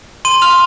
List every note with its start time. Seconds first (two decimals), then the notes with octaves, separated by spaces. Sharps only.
0.25 C6 D#7
0.42 F6 F7